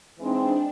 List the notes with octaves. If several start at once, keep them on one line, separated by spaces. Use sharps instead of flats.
E3 G#3 C4 D4 D#4